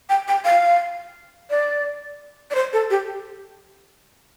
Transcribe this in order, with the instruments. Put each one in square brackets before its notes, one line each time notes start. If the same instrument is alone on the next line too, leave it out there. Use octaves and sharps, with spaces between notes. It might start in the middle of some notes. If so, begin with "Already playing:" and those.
[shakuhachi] G5
G5
F5
D5
D5
C5
A4
G4